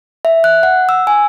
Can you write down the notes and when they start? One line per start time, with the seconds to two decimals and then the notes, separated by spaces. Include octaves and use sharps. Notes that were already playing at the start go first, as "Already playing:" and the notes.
0.25 E5
0.44 F#6
0.63 F#5
0.89 E6
1.07 G#5